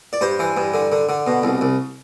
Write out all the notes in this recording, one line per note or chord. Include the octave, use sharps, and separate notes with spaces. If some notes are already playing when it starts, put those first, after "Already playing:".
D5
G2 C5
E3
G2
D3
D3
D3
B2
C2
C2